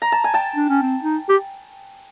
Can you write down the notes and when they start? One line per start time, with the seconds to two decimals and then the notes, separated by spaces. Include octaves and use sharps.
0.02 A#5
0.12 A5
0.24 G#5
0.34 G5 A5
0.56 D4
0.69 C#4
0.82 C4
1.03 D#4
1.29 G4